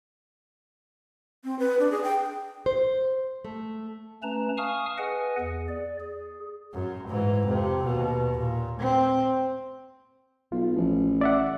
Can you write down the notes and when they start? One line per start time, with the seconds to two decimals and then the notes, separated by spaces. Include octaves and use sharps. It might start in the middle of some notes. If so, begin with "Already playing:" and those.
1.44 C4
1.59 B4
1.79 D4
1.91 G#4
2.04 G5
2.66 C5
3.45 A3
4.23 A3 C#4 B4 A5 A#5
4.57 F5 G#5 A5 C#6 D#6 F6
4.98 G#4 B4 D#5 F#5 G#5
5.39 E2 G#4
5.68 D5
6.00 G#4
6.73 F#2
7.08 G#2 E3
7.46 F2 C3
7.84 D#2 B2
8.38 A#2
8.80 C4
10.52 B1 F4
10.77 A1 F3
11.21 D5 E5 F#5